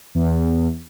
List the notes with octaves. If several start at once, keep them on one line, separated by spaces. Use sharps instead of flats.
E2